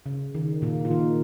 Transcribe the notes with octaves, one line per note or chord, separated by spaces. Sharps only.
C#3
D#3
A#2 A#3
F4
D#3 D#4